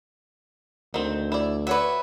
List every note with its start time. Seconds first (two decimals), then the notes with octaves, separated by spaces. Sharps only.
0.94 D2 D#3 C4
1.32 E4 D5
1.67 F#4 B4 C#5 D5 E5